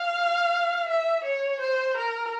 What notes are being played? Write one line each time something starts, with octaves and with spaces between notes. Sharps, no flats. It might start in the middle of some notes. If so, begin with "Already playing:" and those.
Already playing: F5
E5
C#5
C5
A#4